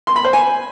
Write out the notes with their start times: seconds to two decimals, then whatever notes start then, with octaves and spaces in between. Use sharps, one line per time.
0.07 C6
0.16 B5
0.24 C5
0.33 G#5